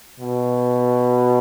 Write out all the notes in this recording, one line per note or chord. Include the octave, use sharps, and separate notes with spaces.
B2